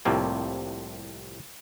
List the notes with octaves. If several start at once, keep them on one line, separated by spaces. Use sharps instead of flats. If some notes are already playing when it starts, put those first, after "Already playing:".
C2 A2 C3 F3 A#3